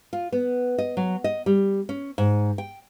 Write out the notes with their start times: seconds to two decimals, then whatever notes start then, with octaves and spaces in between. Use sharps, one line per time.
0.13 F4
0.32 B3
0.78 D#5
0.97 F#3
1.24 D#5
1.46 G3
1.89 C#4
2.18 G#2
2.58 G5